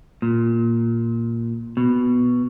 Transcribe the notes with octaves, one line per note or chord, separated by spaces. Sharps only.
A#2
B2